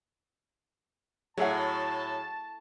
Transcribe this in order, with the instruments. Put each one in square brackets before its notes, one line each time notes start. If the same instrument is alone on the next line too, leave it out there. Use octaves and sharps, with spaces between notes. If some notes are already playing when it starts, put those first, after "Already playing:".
[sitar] A2 [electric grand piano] F#3 [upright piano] G#4 E5 F#5 [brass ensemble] A5